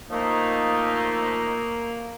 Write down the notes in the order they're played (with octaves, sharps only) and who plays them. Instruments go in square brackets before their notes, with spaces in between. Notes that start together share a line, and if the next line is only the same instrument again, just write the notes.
[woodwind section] F3 A3 D#4 [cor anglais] A#3